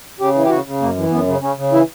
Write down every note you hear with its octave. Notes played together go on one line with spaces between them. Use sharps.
C#3 G4
E3
G4
C#3 F#4
C#3
F#2 A#3
E3
F#2 B3
C#3
C#3 C#4
C#3
E3 E4